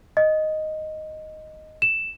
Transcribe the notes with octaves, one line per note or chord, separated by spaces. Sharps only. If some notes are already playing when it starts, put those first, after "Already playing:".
D#5
E7